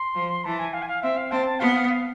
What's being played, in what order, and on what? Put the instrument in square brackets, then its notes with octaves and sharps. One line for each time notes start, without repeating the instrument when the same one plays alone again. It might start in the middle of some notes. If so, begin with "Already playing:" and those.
Already playing: [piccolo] C6
[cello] F3
[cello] E3 [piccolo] A5
[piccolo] G#5
F5
G#5
F5
[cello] C4 [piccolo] E5
[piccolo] F5
[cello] C4 [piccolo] A5
[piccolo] A5
[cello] B3 [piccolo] F5
[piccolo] F5
F5